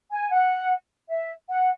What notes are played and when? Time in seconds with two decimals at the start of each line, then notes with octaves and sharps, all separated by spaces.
0.11 G#5
0.31 F#5
1.08 E5
1.48 F#5